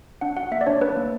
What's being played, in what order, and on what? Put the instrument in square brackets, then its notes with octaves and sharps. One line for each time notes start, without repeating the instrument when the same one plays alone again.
[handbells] D4 F#5
F#4 F#5
A#3 E5
D5
D4 C#5
D4 B4
A#3